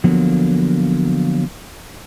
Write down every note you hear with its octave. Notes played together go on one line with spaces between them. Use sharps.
D3 F3 F#3 A#3 B3